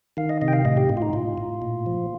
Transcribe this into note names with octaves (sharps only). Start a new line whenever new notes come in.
D#3 F5
D#5
C3 D#5
G5
F5
A2 D#5
G4
A2
F4
D#4
A2 F4
A2
A#2
F3